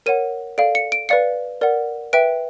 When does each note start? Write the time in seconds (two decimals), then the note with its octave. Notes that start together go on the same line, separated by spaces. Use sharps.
0.06 A#4 C#5 F#5 D#7
0.58 A4 D5 F5 D7
0.75 C#7
0.92 D7
1.09 B4 D5 F5 C#7
1.61 A#4 D5 F#5
2.13 B4 E5 G5 D7